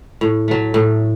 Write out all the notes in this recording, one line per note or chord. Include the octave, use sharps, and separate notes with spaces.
A2
F#3 A3
A2